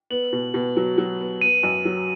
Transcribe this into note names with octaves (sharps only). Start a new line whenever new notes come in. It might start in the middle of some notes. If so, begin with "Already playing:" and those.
B3 F#7
B2
B2
F#3
F#3
B3
B3 D#7
F#2
F#3